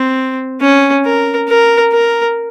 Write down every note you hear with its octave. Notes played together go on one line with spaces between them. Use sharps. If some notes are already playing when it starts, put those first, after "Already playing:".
Already playing: C4
C#4
A#4
A#4
A#4